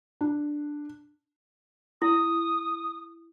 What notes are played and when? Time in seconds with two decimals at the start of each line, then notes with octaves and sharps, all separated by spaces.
0.21 D4
2.02 E4 D#6